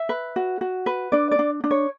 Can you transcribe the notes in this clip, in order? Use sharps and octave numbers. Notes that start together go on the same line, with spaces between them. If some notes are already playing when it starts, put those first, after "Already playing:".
Already playing: E5
B4
F#4
F#4
B4
D4 D5
D5
D4
D4
C#5